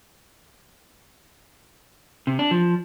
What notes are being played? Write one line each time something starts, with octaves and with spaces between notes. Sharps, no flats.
C3
D4
F3